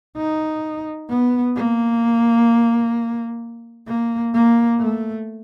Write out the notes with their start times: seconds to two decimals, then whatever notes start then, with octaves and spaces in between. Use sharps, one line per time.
0.17 D#4
1.10 B3
1.56 A#3
3.87 A#3
4.34 A#3
4.80 A3